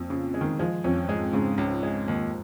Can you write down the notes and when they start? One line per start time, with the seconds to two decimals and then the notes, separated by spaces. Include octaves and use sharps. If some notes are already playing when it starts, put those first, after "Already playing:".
Already playing: F2 A#2
0.10 C#3
0.34 G#3
0.41 D#3
0.59 F3 G#3
0.84 F2 C#4
1.08 G#2 G#3
1.33 G#2 C#3
1.58 C#2
1.83 G#3
2.08 D#2